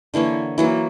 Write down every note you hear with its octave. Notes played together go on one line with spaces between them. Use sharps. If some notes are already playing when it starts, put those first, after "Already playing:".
D3 E3 A#3 C#5
E3 F#3 A#3